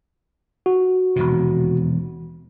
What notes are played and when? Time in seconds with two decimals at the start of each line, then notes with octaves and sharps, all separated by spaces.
0.66 F#4
1.16 E1 D#2 C3